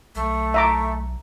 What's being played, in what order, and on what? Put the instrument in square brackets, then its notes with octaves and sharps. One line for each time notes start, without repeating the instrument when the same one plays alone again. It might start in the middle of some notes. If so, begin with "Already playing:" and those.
[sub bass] B1 [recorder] A3
[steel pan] E5 A#5 D6